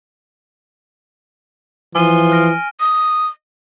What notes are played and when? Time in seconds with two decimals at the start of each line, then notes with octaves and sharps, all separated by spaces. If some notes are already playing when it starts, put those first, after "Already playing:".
1.95 E3 F3 G#5 D#7 G7
2.32 F6 A#6 D7
2.80 D#6